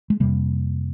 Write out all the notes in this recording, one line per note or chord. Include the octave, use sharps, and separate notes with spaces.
G#3
F2 C3 G3 A#3